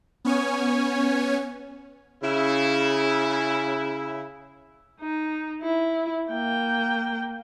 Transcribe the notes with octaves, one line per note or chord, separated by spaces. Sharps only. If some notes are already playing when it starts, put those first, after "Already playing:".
B3 C#4 C#5 G#5
C#3 E4
D#4
E4
A#3 G5